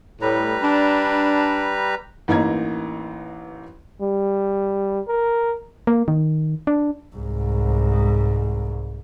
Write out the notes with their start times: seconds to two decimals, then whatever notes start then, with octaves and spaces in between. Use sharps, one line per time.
0.21 A2 G3 B4 A#5
0.63 D4
2.28 A1 E3 A#3 D#4 A#5 G#6
4.01 G3
5.08 A#4
5.87 A#3
6.08 D#3
6.67 D4
7.16 C2 G#2